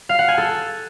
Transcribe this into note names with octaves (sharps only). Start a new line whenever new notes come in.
F5
F#5
G#5
A4